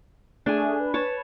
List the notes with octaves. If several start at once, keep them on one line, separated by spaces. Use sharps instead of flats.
A3 D4 G#4 G#5
B4
C#5 A5